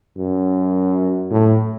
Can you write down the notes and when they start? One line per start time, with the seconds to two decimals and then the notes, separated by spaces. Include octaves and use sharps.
0.17 F#2
1.31 A2